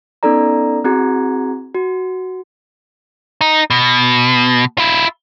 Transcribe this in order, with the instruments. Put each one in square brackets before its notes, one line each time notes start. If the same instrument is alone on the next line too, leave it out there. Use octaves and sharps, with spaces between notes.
[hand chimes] B3 C#4 D#4 A4 D5 A#5
C4 E4 F#4 G#4 A#5 G#6
F#4
[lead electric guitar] D#4
B2
E4 F4